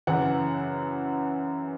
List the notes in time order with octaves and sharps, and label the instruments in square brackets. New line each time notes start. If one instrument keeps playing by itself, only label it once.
[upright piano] F#2 C#3 E3 F#5